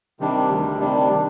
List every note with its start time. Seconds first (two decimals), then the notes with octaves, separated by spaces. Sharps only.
0.20 C3 D#3 G3 D4
0.49 D2
0.79 C3 D#3 G3 D4